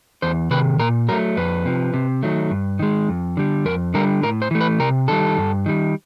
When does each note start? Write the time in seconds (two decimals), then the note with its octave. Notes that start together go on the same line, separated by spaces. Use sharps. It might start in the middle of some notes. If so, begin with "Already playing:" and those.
0.22 E2 C5
0.51 C3 D#3 B4
0.79 A#2 A#4
1.08 F#3 A#4
1.12 A3
1.37 F2 B4
1.65 C3 F3
1.94 C3
2.23 D#3 F#3 A3
2.51 G2
2.79 D#3 G#3
3.09 F2
3.37 D3 G3
3.65 F2 A#4
3.94 D3 G3 A#4
4.23 A2 A#4
4.42 C5
4.51 E3 A3
4.61 B4
4.79 C3 A#4
5.08 D#3 G3 A4
5.38 G2
5.66 D#3 G3